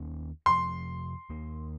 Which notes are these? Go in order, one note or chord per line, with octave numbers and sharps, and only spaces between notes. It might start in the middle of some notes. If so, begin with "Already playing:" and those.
Already playing: D#2 D#3 A#3 C#4
F2 C3 F3 C6
D#2 D#3 A#3